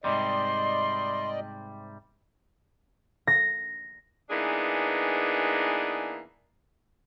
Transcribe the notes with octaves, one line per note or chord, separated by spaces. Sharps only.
G#2 C3 G3 D5 D#5 C6
A#6
E3 A#3 B3 D4 D#4 G#4